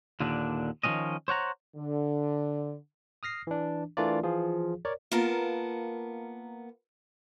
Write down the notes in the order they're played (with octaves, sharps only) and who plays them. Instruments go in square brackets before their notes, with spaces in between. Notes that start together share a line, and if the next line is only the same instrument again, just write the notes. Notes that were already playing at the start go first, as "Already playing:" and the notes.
[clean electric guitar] D#2 A#2 D3 D4
D#3 F3 F#3 C4 C#4 D#5
C5 C#5 F#5 A#5
[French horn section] D3
[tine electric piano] D#6 F6 A#6 C7
E3 D4
E3 A3 D4 F4 A#4 D5
E3 F3 F4 G#4
A#4 C#5 D5
[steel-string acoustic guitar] A#3 B3 F4 A#4 A5